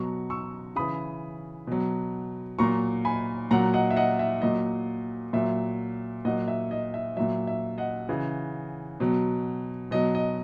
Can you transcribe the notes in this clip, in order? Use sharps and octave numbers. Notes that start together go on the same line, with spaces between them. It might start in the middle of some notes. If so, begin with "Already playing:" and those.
Already playing: B2 F#3 A#5 C#6
C#6 E6
C#3 E3 B5 D#6
B2 F#3
A#2 F#3 A#5 C#6
G#5 B5
A#2 F#3 F#5 A#5
D#5 F#5
E5
D#5 F#5
E5
A#2 F#3 D#5
A#2 F#3 E5
A#2 F#3 D#5 F#5
E5
D#5
E5
A#2 F#3 E5
E5
D#5 F#5
C#3 E3
B2 F#3
B2 F#3 D#5
D#5